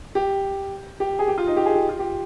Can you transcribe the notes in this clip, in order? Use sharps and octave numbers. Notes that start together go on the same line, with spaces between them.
G4
G4
G#4
G4
F4
D#4
G4
G#4
G4
F4
G4